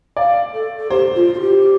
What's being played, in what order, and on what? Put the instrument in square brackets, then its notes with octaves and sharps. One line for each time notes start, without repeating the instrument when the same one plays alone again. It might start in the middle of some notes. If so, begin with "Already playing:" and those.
[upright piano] D5 [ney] F5
[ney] A4
A4
[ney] G4 [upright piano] C5
[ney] F4
F4
G4